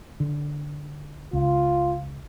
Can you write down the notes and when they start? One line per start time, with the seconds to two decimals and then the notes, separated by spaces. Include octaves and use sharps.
0.20 D3
1.33 C#2 F4